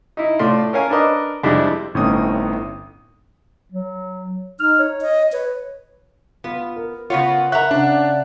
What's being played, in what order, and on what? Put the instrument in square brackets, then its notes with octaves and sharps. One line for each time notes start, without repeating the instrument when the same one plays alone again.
[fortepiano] D#4 E4
A2 A3 F4 D5 C6
C#4 A4 A#4 C#5 F5 G#5
D4 A#4 B4 D#5 D6
F2 G3 G#3 D4 E4
[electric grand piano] G1 A2 C4 C#4 D#4 D#6
[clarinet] F#3
[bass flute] D#4 [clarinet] F6
[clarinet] C#5
[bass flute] D#5
[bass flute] B4 [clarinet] C#5
[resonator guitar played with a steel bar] B3 [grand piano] F4
[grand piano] A#4
[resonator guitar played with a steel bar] C#3 B3 C#5 [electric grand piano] F4 [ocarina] F#5
[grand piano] A#4 C#6 [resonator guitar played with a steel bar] E5 A#5 [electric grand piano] F#6
[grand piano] C#3 F#5 [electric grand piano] D4 [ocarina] D5